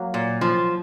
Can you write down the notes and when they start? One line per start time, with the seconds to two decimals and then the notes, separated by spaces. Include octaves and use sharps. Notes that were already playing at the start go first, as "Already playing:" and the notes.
Already playing: F#3 A#3
0.14 A#2
0.41 F3